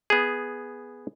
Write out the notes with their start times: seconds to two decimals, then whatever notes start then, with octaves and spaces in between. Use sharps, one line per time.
0.10 B3 G#4